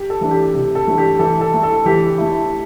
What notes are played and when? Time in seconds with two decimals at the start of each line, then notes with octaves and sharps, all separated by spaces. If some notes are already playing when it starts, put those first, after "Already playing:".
Already playing: G4
0.10 A4
0.21 E3 A3 D4
0.31 G4
0.54 C3
0.75 A4
0.87 E3 A3 D4
0.98 G4
1.19 E3 A4
1.41 A4
1.53 A3 E4
1.63 A4
1.86 E3 G4
2.18 A3 E4